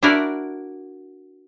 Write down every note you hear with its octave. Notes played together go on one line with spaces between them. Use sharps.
D4 E4 F#4 A#4 D5